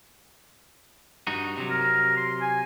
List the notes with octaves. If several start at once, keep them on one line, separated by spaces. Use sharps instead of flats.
G2 D#4 F#4
C3 F#3
A#4
C6
G#5